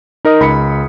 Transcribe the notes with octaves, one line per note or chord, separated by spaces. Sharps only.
D#4 A#4 D#5 D#6
C#2 B5 B6 C#7